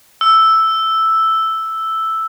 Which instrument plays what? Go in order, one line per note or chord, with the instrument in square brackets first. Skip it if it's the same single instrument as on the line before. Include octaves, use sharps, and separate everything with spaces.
[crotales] E6